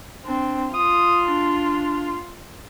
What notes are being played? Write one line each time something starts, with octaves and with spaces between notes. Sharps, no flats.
C4 D4
F4 D#6
D4